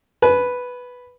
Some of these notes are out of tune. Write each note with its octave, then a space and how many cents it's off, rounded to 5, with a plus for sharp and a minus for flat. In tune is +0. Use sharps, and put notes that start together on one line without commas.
B4 +0 G#5 +40